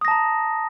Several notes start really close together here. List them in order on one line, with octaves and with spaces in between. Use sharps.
D#6 A#6 A5 A#5